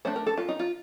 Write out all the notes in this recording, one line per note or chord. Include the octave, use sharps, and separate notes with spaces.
A3 D4 C5
A#4
A4
F4
D#4
F4